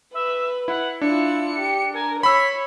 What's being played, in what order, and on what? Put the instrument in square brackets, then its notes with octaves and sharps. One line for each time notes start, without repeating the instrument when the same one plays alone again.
[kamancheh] B4 [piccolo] E5
[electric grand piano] E4 [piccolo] F#5
[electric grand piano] D4 [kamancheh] E4 F4 [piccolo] C#7
[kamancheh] G4
[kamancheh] A#4 [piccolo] G#5
[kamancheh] C#5 [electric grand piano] B5 E6 [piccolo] B6